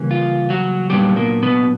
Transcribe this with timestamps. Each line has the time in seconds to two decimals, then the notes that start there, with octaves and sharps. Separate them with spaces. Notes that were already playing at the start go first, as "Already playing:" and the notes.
Already playing: C#3 E3 G3 A#3 C#4
0.11 F4
0.50 F#3 F#4
0.90 A#2 F#3 G3 B3 D4 G4
1.16 A#3 A#4
1.43 B3 B4